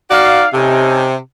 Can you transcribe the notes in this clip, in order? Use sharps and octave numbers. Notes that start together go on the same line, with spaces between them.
D#4 F#4 D5 F5
C3 C#4 D#4 A4